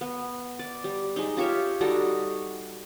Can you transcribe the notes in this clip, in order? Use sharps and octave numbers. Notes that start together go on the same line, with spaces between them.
B3
D5
G3
G#3 D#4
F4 G4 C#5 E5
G3 D#4 F#4 A4